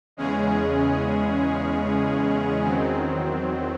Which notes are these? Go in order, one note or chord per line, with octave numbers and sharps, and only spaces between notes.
E2 C#3 G#3 C#4 G#4
E2 D#3 F#3 C4